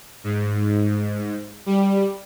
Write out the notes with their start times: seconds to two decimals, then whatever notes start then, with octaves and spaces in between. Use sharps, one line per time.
0.24 G#2
1.66 G3